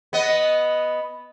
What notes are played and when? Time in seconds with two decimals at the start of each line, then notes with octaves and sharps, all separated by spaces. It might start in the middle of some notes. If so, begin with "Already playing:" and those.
0.13 B3 D#5